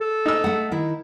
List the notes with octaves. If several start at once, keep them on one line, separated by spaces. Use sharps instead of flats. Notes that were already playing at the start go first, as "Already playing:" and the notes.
A4
D#4 E6
A3 F#5
D#3 E4